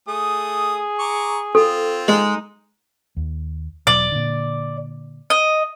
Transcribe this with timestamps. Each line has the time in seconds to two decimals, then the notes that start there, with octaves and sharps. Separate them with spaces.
0.08 A3 G#4 D#6
0.99 A#5 C#6 D6
1.55 C4 F4 A4
2.08 G#3 D#4
3.16 D#2
3.87 E1 B2 F#3 D5
4.12 A#2 D3
5.30 D#5